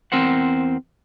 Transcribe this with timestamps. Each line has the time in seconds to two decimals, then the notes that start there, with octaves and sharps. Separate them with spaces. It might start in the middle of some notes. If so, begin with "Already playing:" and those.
0.12 E2 C4 A#4 C5 F#5